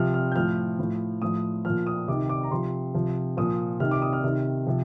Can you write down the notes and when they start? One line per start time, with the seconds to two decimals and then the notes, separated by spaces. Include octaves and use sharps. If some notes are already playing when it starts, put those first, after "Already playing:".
Already playing: C3 F3 F6
0.14 F6
0.32 G6
0.36 A2 F3 F6
0.79 A2 F3
1.22 A2 F3 D#6
1.65 A#2 F3 F6
1.87 D#6
2.08 C3 D#3 D6
2.29 D6
2.44 A#5
2.51 C3 F3 C6
2.94 C3 F3
3.37 A#2 F3 D#6
3.80 C3 D#3 F6
3.91 D6
4.02 D#6
4.13 F6
4.24 C3 D#3
4.66 C3 F3